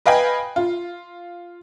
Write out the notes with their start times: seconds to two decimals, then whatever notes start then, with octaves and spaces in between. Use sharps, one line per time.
0.06 B4 D#5 F5 G5 G#5 B5
0.56 F4